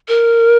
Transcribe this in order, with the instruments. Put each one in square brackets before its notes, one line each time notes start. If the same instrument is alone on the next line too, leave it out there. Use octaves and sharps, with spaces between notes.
[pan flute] A#4